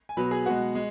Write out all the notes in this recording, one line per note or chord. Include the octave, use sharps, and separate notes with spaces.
G#5
B2 F#3 B4 B5
G#4 G#5
B2 G#3 F#4 F#5
G#3